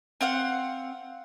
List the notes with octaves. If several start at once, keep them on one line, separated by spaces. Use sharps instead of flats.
C4 F5 F#5